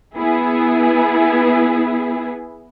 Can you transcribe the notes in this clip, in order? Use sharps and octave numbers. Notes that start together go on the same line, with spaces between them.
B3 E4 G#4 B4